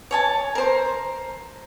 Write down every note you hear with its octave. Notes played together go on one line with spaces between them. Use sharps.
C#5 G#5 A5
A#4 C5